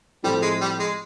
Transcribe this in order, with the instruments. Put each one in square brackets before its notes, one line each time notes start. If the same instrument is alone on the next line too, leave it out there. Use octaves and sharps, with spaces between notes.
[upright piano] A2 F3 A3 C4 E4 [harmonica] G3
[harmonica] G#3
G3
G#3